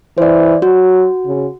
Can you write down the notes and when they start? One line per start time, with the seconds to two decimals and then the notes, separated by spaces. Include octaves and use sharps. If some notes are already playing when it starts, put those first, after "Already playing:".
0.18 E3 C5 D5
0.62 F#3 F#4
1.26 C#3